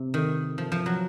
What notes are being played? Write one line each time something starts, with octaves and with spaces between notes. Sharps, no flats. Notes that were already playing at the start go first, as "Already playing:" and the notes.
Already playing: C3
D#3
F3
F3
F#3